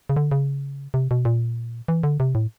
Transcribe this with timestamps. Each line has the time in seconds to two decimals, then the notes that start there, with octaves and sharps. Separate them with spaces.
0.09 C#3
0.17 D3
0.31 C#3
0.94 C3
1.11 B2
1.25 A#2
1.88 E3
2.03 D3
2.20 C3
2.35 A2